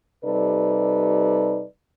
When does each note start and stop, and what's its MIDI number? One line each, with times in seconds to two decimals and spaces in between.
0.24 1.64 48
0.24 1.64 55
0.24 1.64 63
0.24 1.64 69
0.24 1.64 71
0.24 1.64 74